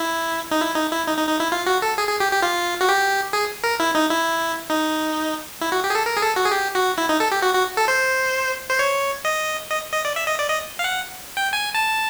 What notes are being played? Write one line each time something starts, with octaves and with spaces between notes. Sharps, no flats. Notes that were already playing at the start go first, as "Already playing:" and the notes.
Already playing: E4
D#4
E4
D#4
E4
D#4
D#4
D#4
E4
F4
F#4
A4
G#4
G#4
G4
G4
F4
F#4
G4
G#4
A#4
E4
D#4
E4
D#4
E4
F#4
G4
G#4
A4
A#4
G#4
A4
F#4
G#4
G4
F#4
E4
D#4
A4
G4
F#4
F#4
A4
C5
C5
C#5
D#5
D#5
D#5
D5
E5
D#5
D5
D#5
F5
F#5
G5
G#5
A5